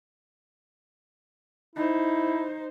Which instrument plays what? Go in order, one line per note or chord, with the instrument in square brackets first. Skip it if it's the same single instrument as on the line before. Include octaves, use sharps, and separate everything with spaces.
[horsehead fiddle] D#4 C5 [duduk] E4